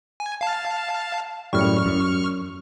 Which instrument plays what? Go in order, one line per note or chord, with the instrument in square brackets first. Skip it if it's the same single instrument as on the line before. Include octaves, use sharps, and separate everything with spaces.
[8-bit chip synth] G#5
F5 A5
[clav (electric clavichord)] F#2 A2 G3 [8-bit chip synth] C#6 F6
[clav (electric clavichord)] F#2